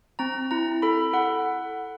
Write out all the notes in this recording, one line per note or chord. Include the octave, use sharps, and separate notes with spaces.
C4 A#5
E4 A#5
A4 B5
A4 F#5